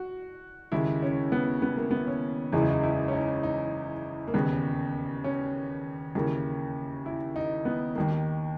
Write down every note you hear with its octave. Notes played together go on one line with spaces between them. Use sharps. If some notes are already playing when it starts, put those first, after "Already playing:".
Already playing: F#4
D#2 C#3 G#3 E4
C#4
B3
B3
A#3
B3
C#4
F#1 E2 C#3 G#3 D#4
E4
D#4
E4
C#4
D#4
D#4
A#3
E1 D#2 C#3 B3
C#4
D#2 C#3 E3 A#3
E4
D#4
B3
D#2 D#3 A#3